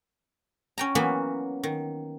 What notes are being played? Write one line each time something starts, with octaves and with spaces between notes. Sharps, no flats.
C#4 G5 A#5
E3 F#3 A#3 B3 F#4
D#3